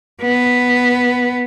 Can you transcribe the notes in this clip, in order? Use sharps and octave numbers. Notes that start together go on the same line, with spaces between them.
B3